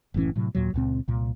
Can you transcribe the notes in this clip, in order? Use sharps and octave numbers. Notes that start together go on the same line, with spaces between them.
F#1 A2 E3 C#4
A2 C3 F#3
D#2 A#2 F#3
C#2 A#2 C4
C2 A#2